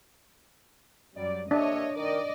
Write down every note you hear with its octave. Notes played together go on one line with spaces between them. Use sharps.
F#2 F#3 G3 D5
A#3 D4 G4 C#5 D#5 E5
D#3 A#4 D5 D#5